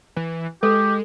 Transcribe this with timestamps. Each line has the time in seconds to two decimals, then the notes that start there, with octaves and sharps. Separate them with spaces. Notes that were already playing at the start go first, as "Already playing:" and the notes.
0.16 E3
0.63 G#3 G4 A4